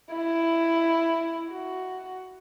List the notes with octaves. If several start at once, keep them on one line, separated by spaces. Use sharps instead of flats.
E4
F#4